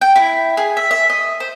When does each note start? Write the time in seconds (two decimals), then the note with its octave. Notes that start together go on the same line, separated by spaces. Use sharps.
0.01 G5
0.16 E4
0.57 G#4
0.77 E5
0.91 E5
1.10 D#5
1.40 C5